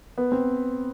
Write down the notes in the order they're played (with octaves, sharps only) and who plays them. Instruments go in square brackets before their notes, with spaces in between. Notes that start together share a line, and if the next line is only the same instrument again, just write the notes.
[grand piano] B3
C4